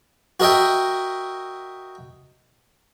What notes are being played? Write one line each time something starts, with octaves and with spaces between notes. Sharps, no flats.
F#4 A#4 D#5 E5 G5